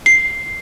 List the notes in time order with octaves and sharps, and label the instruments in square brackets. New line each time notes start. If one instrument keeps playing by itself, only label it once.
[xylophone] C7